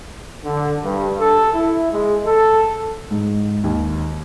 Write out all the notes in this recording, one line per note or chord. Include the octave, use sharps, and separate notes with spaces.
D3
G2
A4
E4
G#3
A4
G#2
D#2